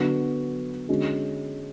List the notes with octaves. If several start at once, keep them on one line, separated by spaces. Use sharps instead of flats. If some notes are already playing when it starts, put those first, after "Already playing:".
Already playing: D3 F#3 B3 F#4
D3 G#3 C#4 F#4